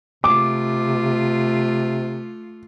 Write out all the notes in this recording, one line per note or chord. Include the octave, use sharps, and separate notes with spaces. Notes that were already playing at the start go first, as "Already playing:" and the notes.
C3 A3 F4 D6